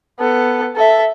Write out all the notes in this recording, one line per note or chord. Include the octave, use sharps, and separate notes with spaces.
B3 A4
A4 E5